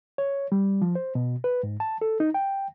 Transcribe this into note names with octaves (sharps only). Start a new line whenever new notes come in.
C#5
G3
F3
C5
B2
B4
G#2
A5
A4
D#4
G5